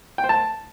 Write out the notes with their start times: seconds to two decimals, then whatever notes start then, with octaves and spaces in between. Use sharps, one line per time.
0.18 G5
0.24 C5
0.29 A5